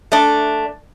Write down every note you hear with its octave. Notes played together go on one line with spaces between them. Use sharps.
A3 D4